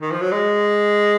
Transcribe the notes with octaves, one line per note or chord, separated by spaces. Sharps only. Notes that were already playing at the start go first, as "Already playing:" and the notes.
D#3
F3
F#3
G#3